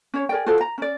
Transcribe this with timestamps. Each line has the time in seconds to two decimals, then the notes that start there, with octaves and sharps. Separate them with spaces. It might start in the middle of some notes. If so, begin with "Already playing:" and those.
0.14 C#4 C#5
0.29 G#4 A#4 D5 G5
0.46 F4 F#4 A4 C5
0.61 A#5
0.78 C#4 D5